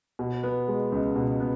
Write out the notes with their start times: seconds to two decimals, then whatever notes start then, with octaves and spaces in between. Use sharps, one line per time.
0.19 B2
0.43 B3
0.68 G#3
0.92 C#2
1.16 B2
1.40 B3